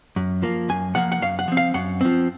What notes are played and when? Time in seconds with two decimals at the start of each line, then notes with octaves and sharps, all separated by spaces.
0.16 F#2
0.42 F3 A#3
0.69 F#2 G#5
0.95 F3 A#3 F#5
1.12 F#5
1.22 F#2 F5
1.39 F#5
1.48 F3 C4
1.57 F5
1.74 F#2 F#5
2.01 F3 C4